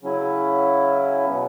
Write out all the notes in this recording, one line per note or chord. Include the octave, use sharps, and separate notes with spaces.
C#3 F#3 C#4 E4
B2 F#3 B3